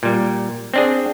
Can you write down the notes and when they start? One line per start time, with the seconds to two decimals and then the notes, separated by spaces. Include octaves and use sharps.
0.03 A#2 G3
0.74 C4 D4 G#4